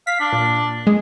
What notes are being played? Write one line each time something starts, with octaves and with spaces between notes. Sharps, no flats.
F5 B6
D4
A#2
G#3